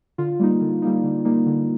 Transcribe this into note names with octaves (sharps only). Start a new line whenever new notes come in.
D3 F4
G3 A#3 D#4
D3
G3 A#3 D#4
D3
G3 A#3 D#4
D3